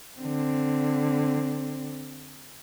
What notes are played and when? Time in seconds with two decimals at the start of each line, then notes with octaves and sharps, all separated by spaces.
0.19 D3 C4